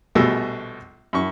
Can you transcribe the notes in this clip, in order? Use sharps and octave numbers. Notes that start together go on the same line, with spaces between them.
A#1 B2 G3 A3 G#4 E6
F#2 C#6